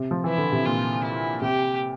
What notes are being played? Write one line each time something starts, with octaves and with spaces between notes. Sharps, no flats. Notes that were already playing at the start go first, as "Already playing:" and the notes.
Already playing: C3
F3
E3 E4
D3
C3
A#2 F4
E4
C3 G4